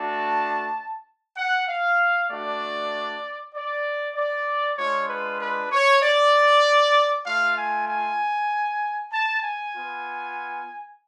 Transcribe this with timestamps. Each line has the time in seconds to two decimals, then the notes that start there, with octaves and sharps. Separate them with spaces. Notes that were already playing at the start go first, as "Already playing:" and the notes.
Already playing: A3 D4 F#4 A5
1.37 F#5
1.68 F5
2.29 A3 D4 F#4 D5
3.54 D5
4.16 D5
4.77 G#3 D4 F4 C#5
5.09 B4
5.40 B4
5.72 C#5
6.02 D5
7.26 A3 F4 F5
7.57 G#5
7.88 G#5
9.12 A5
9.43 G#5
9.74 B3 F4